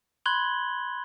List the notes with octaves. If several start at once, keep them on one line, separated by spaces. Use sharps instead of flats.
B5 C6 F#6 G#6 F#7 G7